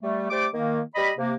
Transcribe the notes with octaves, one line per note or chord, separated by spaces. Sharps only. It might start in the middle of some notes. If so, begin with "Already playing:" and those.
G3 A3
G3 A3 C5 D6
D#3 A#3
G3 D#5 B5
C3 A#3